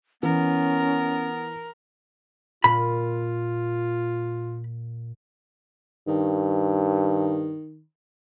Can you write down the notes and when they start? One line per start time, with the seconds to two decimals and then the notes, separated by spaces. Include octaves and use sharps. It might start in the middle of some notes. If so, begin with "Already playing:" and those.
0.23 E3 B3 C#4 A#4
2.64 A#2 F4 B5
6.08 G2 D#3